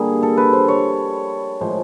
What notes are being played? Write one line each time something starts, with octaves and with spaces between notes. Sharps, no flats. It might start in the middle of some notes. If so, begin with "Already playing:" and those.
Already playing: D3 G3 A#3 G#4
A4
B4
C5
C#5
A2 F3 G#3 C5